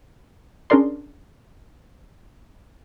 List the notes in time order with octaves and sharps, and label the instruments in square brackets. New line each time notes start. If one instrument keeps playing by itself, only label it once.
[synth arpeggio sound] C#4 D4 G#4 A#4 D5 C6